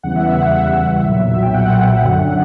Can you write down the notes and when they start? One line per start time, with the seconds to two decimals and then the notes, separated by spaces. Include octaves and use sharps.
0.03 E2 C#3 E3 G3 F#5
0.16 E5
0.28 E5
0.41 F#5
0.53 E5
1.04 B1 A#2 F#3
1.42 G5
1.54 F#5
2.03 F#2 D3 F#3